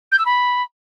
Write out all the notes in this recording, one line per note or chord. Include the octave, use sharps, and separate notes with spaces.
G6
E6
B5